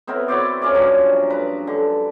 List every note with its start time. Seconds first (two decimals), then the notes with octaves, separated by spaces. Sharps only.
0.07 B3 C4 E4 A#4
0.28 E4 F#4 C5 D5
0.62 C#4 F4 A#4 D5
0.74 G2 A#2 F3 F#3
1.30 B4 A#5
1.67 D3